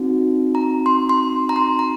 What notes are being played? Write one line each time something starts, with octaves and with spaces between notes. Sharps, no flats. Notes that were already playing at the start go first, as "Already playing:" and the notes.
Already playing: C4 D#4 F#4
A#5
C6
C6
A#5
C6
A#5